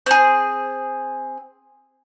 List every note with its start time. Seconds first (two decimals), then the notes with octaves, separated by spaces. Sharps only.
0.06 C4 G#4